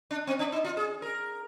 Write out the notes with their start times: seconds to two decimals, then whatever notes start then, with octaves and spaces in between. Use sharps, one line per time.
0.11 D4
0.27 C4
0.39 D4
0.52 D#4
0.65 F4
0.77 G#4
1.02 A#4